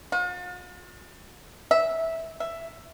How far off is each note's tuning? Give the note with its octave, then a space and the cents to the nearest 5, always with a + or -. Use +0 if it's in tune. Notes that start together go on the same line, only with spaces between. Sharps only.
F4 +45
E5 -15
E5 +10